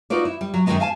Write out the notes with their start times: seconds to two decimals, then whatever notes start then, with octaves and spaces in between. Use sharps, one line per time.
0.10 D#4 F4 F#4 B4 D5
0.25 E4
0.41 G3
0.54 F#3
0.66 F#2 D#3 F3 F#3 G#3 B3
0.80 F5 G#5 A5